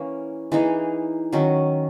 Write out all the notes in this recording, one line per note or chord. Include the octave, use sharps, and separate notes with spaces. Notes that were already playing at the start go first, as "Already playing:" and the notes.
Already playing: E3 A#3 C#4
E3 A#3 D#4 G#4
D#3 F#3 C#4